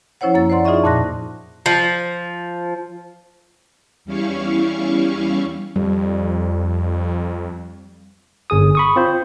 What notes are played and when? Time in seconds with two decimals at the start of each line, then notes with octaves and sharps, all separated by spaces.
0.21 F3 C#4 E4 C5 C#5 F#5
0.34 F#2 A#3 A6
0.50 C5 D5 F#5 C6
0.65 D#4 F4 G#4 D#5 E5 C#6
0.84 F2 A#2 C6 F#6 A#6
1.66 F3
4.05 E2 G3 C#4 E4 F5 C#6
5.76 F2 G3
8.50 G1 G#4 D#6
8.75 B5 C#6 D#6
8.96 C4 F4 C5